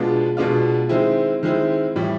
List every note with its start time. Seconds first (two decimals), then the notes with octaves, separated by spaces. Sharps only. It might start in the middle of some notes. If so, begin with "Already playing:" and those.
Already playing: B2 G#3 B3 D4 F4
0.37 B2 G#3 B3 D4 F4
0.89 D#3 G#3 C4 E4
1.43 D#3 G#3 C4 E4
1.96 A2 E3 G3